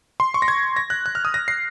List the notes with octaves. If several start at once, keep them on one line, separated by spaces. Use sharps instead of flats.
C6
C#6
A#6
G#6
A#6
F#6
F#6
F6
D#6
A#6
C7